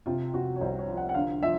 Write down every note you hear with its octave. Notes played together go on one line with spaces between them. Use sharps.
C3 F4
C3 F#4
C#5
C2 C5
C#5
F3
F#5
F#5
D3 F5
F3 E5